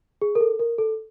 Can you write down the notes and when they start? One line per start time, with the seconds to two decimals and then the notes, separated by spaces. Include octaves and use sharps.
0.22 G#4
0.35 A#4
0.41 A4
0.59 A#4
0.78 A4